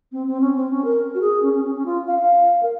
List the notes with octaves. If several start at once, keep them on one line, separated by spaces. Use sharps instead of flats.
C4
C4
C#4
C4
C#4
A#4
F#4
G#4
C#4
C#4
C#4
C#4
F4
F5
F5
A#4